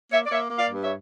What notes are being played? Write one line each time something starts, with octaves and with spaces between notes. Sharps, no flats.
A#3 C#5 E5
D5
A#3 C#5 E5
A#3
D5 F5
G2
C#5 E5